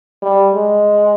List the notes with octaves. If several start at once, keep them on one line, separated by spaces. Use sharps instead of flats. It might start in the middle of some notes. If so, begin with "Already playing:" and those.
G3
G#3